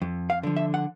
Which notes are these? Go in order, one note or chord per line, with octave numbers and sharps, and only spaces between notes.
F2
F5
D3 F3
E5
F#5